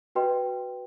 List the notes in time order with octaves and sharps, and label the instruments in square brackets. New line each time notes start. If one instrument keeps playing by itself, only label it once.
[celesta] F#4 B4 D#5 G5 C6